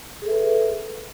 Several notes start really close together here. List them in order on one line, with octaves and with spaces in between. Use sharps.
G#4 A4 E5 B4